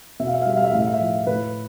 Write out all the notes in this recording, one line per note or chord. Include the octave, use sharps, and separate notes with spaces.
B2 E5
F5
E5
F5
G3 E5
F5
E5
A2 F5
E5
F5
E5
F3
A2 B4